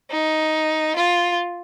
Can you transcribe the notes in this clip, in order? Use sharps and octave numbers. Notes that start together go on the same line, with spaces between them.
D#4
F4